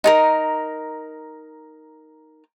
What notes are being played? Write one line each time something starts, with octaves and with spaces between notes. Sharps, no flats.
D#4 A4 A#4